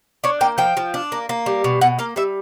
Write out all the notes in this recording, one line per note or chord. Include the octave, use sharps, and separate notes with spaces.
D4 C#5
A#3 G5
F3 G5
F3
D4
A#3
A#3
G3
B2
B2 F#5
A#3 F5
G3 E5